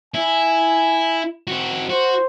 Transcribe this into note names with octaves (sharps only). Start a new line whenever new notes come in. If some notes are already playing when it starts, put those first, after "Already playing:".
E4 G#5
C4 F#4
F#4 C5